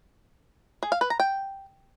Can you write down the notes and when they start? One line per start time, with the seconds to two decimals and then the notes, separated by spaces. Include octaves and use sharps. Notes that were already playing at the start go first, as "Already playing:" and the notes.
0.83 G#4
0.92 F5
1.01 B4
1.10 A#5
1.20 G5